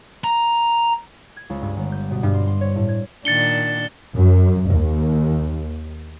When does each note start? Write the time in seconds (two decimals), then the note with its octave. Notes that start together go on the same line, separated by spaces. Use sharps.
0.24 A#5
1.37 G#6
1.50 C#2
1.62 G2
1.77 G1
1.92 G6
2.11 B2
2.23 G2
2.34 C6
2.47 C6
2.61 C#5
2.76 A2
2.88 G#6
3.25 A#2 D#3 D4 A6 C#7 G7
4.15 F#2
4.69 D#2